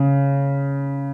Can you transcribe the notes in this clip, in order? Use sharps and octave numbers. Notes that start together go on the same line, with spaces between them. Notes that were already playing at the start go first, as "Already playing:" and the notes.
Already playing: C#3